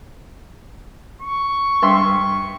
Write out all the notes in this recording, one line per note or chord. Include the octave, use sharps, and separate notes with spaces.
C#6
G2 E5 C6